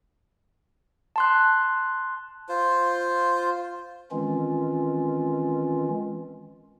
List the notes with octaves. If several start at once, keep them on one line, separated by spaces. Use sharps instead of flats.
A5 C6 F#6
F4 C5
D#3 E3 G#3 C4 C#4 F4